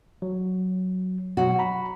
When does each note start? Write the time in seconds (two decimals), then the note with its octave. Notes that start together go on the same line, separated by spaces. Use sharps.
0.22 F#3
1.37 B2 F#3 F#4
1.59 A#5 B5